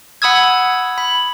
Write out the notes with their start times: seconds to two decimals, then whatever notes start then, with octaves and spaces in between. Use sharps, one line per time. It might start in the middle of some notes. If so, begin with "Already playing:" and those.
0.22 F#5 B5 D#6 E6 G#6
0.98 B5